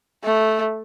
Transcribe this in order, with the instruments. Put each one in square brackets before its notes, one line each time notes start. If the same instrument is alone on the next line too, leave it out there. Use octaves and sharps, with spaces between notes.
[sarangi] A3